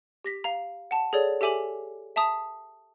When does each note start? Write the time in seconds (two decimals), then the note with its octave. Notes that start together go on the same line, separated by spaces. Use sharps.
0.24 G4 A#6 B6
0.44 F5 A#5
0.91 F#5 A5
1.13 G#4 A4 C#5 D5
1.41 G4 A4 E5 G#5 D6 F#7
2.16 E5 A5 A#5 D#6